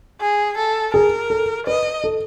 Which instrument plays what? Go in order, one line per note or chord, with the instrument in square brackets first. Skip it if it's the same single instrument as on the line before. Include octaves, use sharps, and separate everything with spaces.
[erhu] G#4
A4
[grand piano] G#4 [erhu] A#4
[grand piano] A4
[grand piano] B4 [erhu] D#5
[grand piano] A4